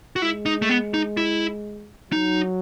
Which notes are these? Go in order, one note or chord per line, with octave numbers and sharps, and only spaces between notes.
F#4
G#3 E4
D#4
A3
B3
D#4
E4
F#3 D#4